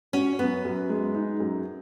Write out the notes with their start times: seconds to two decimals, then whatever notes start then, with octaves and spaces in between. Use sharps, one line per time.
0.13 C#4 F#4
0.39 F#2 B3
0.65 F#2
0.89 G#3
1.15 D#4
1.40 F#2